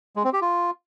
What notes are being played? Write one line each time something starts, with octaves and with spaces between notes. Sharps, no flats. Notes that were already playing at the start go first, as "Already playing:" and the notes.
G#3
C4
G4
F4